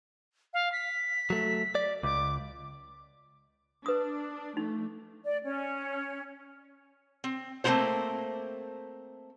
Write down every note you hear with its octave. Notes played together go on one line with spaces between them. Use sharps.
F5
B6
F#3 A3
D5
C#2 D6
D4 B4 D#6
F3 A3 D#4
D5
C#4
C4
A3 A#3 C4 E4 F4 C5